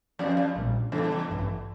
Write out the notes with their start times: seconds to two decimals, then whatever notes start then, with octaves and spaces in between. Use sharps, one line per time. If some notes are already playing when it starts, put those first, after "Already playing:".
0.19 F2 F3 C#4 G4 D5 F5
0.37 F2
0.56 A#1 A#2 G3
0.92 E2 C#3 E3 G3 D4 A4
1.28 A1 G2 E3